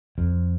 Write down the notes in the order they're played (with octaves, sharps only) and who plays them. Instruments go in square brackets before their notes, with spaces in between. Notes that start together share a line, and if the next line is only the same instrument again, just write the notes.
[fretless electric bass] F2